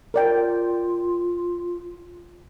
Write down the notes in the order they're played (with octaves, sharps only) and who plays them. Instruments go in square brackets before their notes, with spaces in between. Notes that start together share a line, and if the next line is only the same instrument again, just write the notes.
[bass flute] F4 [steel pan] A#4 D5 G5